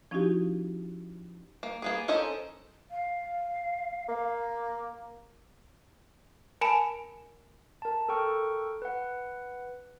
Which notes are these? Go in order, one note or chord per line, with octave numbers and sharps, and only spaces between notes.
F3 C#4 D#4 E4 F#4 G4
A#3
A#3 B3 G#4
C#4 A4 A#4 C5 D#5
F5
A#3
A#4 G#5 A5 B5 D7 E7
A#4 A5
A4 A#4 G5 C#6 F6
B4 F#5